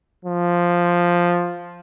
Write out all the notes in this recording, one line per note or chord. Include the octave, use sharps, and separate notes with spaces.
F3